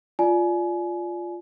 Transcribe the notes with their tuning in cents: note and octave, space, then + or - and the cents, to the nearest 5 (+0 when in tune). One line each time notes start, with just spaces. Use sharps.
F4 +0 D5 +0 G#5 +30